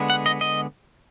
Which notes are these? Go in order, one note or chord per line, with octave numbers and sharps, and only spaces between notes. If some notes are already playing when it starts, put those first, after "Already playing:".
Already playing: D3 G#3 B3
F#5
D#5
D#5